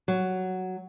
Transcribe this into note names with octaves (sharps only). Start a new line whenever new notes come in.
F#3